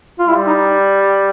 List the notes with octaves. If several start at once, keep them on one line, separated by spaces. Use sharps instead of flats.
F4
G3 E4
D#4